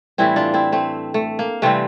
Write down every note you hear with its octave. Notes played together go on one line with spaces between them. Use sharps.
A2 E3 G3 C4 E4
D4 F4
C4 E4
A3 C4
A3
A#3
C3 E3 G3 A3 C4